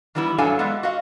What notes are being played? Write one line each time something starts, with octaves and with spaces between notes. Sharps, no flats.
D#3 E3 G3 B3 E4
G2 F#3 D4 A4 F5 G#5
G#3 B3 D5 E5
F#4 D#5 F5